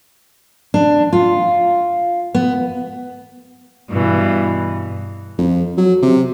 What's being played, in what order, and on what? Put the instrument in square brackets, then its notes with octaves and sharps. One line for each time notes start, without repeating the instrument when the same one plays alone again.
[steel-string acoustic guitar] D4
F4
B3
[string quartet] G2 B2 E3
[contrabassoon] F2
F#3
C3